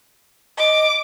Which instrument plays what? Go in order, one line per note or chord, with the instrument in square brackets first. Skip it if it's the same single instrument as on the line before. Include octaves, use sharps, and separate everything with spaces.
[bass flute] D#5 [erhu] D6